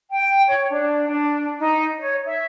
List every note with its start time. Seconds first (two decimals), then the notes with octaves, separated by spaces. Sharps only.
0.10 G5
0.47 C#5
0.70 D4
1.10 D4
1.60 D#4
2.00 C#5
2.24 E5